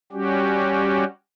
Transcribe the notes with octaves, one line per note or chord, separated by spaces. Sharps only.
G3 C#4 F#4 G4